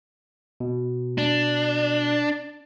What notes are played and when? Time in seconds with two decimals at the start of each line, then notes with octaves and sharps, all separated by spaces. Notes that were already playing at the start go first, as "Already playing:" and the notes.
0.60 B2
1.18 D4